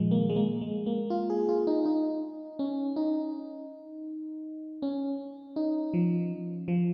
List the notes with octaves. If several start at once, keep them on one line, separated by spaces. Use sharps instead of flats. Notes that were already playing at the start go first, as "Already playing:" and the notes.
Already playing: A#2 D#3 F3 G#3
A#3
G#3
A#3
G#3
A#3
F4
G#4
F4
D#4
D#4
C#4
D#4
C#4
D#4
F3
F3